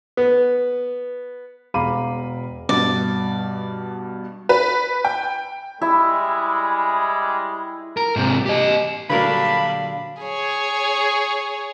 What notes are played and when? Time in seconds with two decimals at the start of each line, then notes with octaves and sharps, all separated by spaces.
0.17 B3
1.74 E1 F5 A#5 B5 D6 D#7
2.69 G2 B2 D5
4.49 B4
5.05 G5
5.81 G3 G#3 E4 E5
7.97 A#4
8.16 G#2 C3
8.46 G4 D#5
9.10 A#2 D3 F#3 G3 D4 A#4 F5 B5
10.22 G#4 C#5